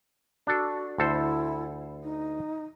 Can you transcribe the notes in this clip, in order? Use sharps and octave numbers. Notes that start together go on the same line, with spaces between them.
D4 F#4 A4
D2 E4 A4 C5
D#4